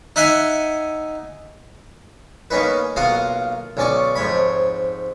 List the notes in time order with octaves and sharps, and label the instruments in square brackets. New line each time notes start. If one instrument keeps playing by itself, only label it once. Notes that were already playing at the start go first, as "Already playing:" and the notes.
[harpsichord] D#4 E5 F#5 G#5
A#3 B3 C#4 D#4 B4
B1 A#3 F4 F5 F#5 D#6
B1 C#4 D5 C#6
F2 G#2 C#5 B5